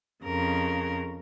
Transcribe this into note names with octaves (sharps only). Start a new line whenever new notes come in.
F2 C#3 A#4